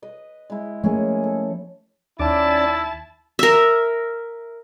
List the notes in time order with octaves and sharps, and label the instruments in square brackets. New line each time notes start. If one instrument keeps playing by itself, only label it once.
[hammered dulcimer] B4 D#5
G#3 E4
[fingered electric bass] F3 A3 A#3 [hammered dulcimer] C#4 G#4
[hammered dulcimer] A4
[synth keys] D#2 [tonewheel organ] C#4 D5 D6 [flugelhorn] E4 [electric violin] A5
[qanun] A#4 E5